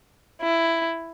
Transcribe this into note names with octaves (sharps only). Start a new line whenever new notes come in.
E4